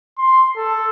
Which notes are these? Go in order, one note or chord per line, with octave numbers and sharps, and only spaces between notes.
C6
A4